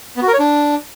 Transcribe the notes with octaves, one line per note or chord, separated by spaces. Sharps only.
B3
F#4
A#4
C#5
D4